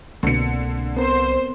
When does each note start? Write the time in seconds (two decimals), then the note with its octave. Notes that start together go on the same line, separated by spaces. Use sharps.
0.23 C2 B2 D3 A#3 C4 C#7
0.97 B3 C4 A#4 C5